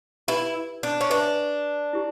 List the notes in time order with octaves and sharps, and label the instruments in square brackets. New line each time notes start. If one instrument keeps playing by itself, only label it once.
[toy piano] D#4 G4 B4 D5 G5 [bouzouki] E4
[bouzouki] D4
C#4
[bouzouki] D4 [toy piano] B4 E5 G#5
[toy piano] E4 G4